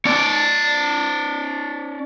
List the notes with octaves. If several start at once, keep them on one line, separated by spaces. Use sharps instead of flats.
C#4 D5